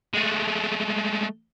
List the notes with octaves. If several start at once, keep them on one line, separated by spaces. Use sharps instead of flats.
G#3 A3